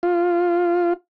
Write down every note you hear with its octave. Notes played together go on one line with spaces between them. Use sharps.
F4